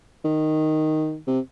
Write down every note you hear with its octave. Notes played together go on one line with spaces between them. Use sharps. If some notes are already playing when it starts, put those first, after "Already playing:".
D#3
C3